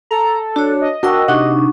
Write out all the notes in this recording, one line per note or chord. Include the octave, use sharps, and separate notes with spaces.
A4 A#5
D4 F#4 C#5
D#5
D4 F#4 A#4 G5 E6
C3 D4 D#4 F#5 C#6